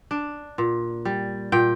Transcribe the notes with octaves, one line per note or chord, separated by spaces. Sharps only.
D4
A#2
G3
A#2 G5